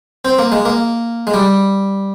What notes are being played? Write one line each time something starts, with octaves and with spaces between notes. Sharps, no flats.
C4
A#3
G#3
A#3
G#3
G3